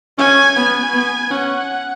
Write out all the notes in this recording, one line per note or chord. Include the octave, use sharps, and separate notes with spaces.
C#4 G#5
B3 G#5
B3
C#4 F#5